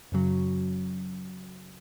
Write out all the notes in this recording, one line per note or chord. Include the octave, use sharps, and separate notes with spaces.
F#2 C#3 F#3